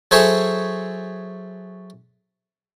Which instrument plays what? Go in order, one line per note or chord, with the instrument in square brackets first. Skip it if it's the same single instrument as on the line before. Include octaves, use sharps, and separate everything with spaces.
[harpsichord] F#3 G#4 A4 C5 C#5 E5